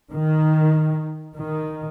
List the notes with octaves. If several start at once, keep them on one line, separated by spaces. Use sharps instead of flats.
D#3
D#3